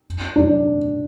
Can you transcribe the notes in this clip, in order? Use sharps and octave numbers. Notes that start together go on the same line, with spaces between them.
D4